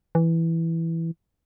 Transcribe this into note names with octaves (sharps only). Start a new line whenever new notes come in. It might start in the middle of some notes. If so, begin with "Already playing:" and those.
E3